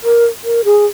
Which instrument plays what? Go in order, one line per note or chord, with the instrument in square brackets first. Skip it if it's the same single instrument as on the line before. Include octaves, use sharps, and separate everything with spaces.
[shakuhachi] A#4
A#4
G#4